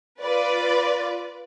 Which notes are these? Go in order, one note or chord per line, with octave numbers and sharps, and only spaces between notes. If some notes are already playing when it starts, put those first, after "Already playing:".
F4 B4 D5